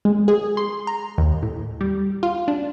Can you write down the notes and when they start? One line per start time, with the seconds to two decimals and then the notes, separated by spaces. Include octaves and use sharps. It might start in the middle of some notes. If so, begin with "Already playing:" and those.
0.05 G#3
0.28 G#4
0.57 C6
0.87 A#5
1.18 D#2
1.43 A2
1.81 G3
2.23 F4
2.48 D4